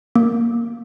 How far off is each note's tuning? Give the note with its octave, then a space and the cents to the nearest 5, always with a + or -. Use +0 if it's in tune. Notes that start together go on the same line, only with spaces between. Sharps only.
A#3 +0 D6 +0